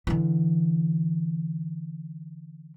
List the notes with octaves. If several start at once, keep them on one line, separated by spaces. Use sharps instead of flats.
D3 E3